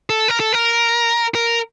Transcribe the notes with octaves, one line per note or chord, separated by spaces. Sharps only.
A4
A#4
A4
A#4
A#4